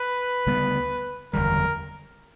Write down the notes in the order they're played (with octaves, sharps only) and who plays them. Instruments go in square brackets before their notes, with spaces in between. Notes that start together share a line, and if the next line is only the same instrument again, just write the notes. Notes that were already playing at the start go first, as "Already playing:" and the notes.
Already playing: [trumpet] B4
[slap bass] D2 C#3 G3 B3
[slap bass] F#1 E2 D3 G3 [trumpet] A#4